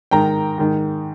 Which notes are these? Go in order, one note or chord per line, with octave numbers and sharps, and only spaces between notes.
G#2 D#3 G5 A#5
G#2 D#3